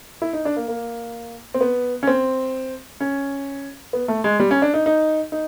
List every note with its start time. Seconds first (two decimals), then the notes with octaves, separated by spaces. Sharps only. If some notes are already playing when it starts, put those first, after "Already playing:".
0.22 E4
0.33 D#4
0.45 D4
0.56 A#3
0.68 A#3
1.54 C4
1.61 B3
2.03 C#4
2.07 C4
3.00 C#4
3.93 B3
4.08 A3
4.24 G#3
4.40 G3
4.51 C#4
4.62 D4
4.74 D#4
4.86 D#4
5.32 D#4